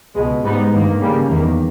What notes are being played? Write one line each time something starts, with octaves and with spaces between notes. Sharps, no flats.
C#2 B2 G#3
G#2 G3 B3 D#4
G2 D#3 A#3
C#3 G3 A#3
E2 D#3 A#3